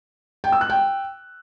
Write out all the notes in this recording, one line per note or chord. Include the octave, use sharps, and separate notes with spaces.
G5
E6
F#6
G5